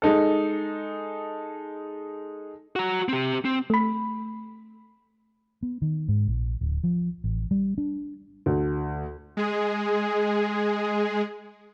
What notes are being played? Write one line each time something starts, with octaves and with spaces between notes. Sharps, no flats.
G#3 D#4 A4
F#4 A#5
C4 G4
C4
A3 B5
B3
D#3
G#2
A#1
D1
F3
A1
G3
D4
D2
G#3 G#4